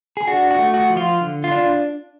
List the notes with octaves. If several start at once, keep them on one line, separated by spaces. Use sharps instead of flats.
G#4
D4 F#4
F#4
A3
F#4
F3
F4
D3
F4
D4